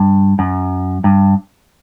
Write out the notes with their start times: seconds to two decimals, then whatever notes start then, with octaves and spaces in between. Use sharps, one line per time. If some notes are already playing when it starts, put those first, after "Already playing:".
Already playing: G2
0.39 F#2
1.04 G2